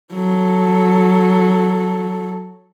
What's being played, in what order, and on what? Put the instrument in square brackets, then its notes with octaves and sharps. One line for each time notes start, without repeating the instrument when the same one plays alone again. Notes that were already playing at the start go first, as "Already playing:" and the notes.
[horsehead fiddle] F#3 A4